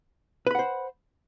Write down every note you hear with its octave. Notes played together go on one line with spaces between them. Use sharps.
B4 C5 F#5 B5